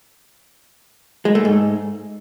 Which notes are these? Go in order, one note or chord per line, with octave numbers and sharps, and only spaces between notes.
G#3
A3
G#2